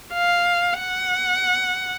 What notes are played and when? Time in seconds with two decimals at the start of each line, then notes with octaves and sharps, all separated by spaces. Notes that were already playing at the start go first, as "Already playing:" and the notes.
0.14 F5
0.80 F#5